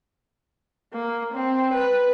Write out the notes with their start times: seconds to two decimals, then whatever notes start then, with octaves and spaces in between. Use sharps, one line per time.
0.93 A#3
1.34 C4
1.74 B4